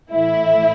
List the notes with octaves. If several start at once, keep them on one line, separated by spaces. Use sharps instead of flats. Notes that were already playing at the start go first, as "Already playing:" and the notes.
A2 E3 E4